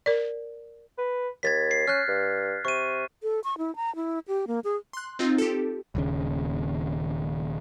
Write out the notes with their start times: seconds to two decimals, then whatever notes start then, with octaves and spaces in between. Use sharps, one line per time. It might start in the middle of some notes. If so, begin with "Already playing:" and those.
0.06 A#4 D5
0.98 B4
1.43 D#2 G#6 A6 B6
1.71 C7
1.87 C#4 F6 F#6
2.08 G2
2.65 C3 C#6 D#7
3.23 A4
3.44 C#6
3.58 E4
3.76 A#5
3.96 E4
4.28 G4
4.48 A#3
4.64 G#4
4.93 C6 F#6
5.19 C4 D#4 F4
5.38 G4 A4
5.95 D#1 D#2 C#3